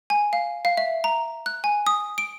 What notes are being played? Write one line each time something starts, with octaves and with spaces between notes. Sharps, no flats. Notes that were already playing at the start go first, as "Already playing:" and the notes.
G#5
F5
F5
E5
A#5
F#6
G#5
D#6
D7